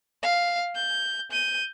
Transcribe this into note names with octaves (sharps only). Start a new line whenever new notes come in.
F5
G6
G6 D#7